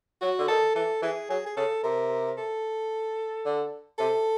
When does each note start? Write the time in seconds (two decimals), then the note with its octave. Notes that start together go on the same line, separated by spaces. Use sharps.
0.21 F#3 F#4
0.38 D3
0.48 D#3 A4
0.75 E3 A4
1.02 E3 G#4
1.29 F#3 G#4
1.46 G#4
1.57 C#3 A4
1.83 C3 A#4
2.38 A4
3.45 D3
3.98 C3 A4